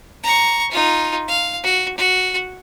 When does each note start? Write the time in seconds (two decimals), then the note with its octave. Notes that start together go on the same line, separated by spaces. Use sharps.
0.23 A#5 C#6
0.72 D#4 F4
1.28 F5
1.63 F#4
1.97 F#4